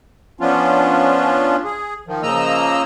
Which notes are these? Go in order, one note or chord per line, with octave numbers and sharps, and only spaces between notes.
F3 B3 C#4 D4 F4
G#4
D#3 F3
C#3 F3 A#3 D#5 A#5 E6